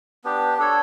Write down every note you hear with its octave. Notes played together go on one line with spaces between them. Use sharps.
B3 D4 G4
D4 A4 C#5